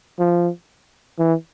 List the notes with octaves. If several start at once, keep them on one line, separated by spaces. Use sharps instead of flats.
F3
E3